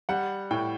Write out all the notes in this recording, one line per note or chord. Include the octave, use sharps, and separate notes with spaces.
G3 F#5
A2 G5